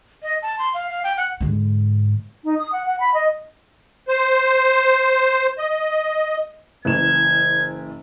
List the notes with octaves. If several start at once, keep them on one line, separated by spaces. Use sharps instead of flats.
D#5
A5
C6
F5
F5
G5
F#5
G#2 D3
D#4
D#6
F#5
F#5
B5
D#5
C5
D#5
F#1 E3 G#6 E7